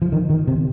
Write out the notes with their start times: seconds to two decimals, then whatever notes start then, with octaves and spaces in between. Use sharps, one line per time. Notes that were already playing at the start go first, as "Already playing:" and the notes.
0.02 F3
0.12 D#3
0.30 D#3
0.47 C3